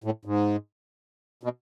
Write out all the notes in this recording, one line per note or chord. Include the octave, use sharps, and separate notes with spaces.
A2
G#2
B2